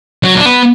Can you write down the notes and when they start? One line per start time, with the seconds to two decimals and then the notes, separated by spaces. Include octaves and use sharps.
0.23 F#3
0.36 D4
0.46 B3